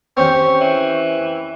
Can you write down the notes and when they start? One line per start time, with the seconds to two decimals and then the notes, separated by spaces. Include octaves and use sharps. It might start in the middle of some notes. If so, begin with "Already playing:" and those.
0.17 C4 C#4 G4 C#5
0.61 E3